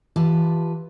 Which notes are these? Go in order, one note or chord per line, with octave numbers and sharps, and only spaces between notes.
E3 F4 G4 B4 A5